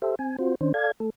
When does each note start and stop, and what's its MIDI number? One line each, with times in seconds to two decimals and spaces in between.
0.02 0.15 67
0.02 0.15 69
0.02 0.15 72
0.02 0.15 76
0.19 0.36 60
0.19 0.36 80
0.39 0.55 60
0.39 0.55 65
0.39 0.55 66
0.39 0.55 72
0.61 0.72 51
0.61 0.72 61
0.61 0.72 62
0.61 0.72 72
0.74 0.91 69
0.74 0.91 74
0.74 0.91 77
0.74 0.91 92
1.00 1.10 57
1.00 1.10 69